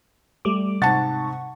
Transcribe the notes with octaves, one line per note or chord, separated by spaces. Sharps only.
G3 A3 D6
G#2 C3 F#5 A5 C#6 A6